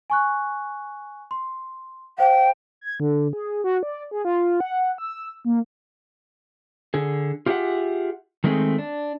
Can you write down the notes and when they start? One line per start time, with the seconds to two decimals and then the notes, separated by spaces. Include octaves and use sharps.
0.10 G#5 C#6 F#6
1.31 C6
2.18 C5 F5 G5
2.81 G#6
3.00 D3
3.33 G#4
3.64 F#4
3.83 D5
4.11 G#4
4.25 F4
4.60 F#5
4.98 E6
5.45 A#3
6.94 D3 G#4
7.46 F4 G4 G#4 A#4 E5 F#5
8.44 D#3 G#3 A3 C4 G#4
8.79 D4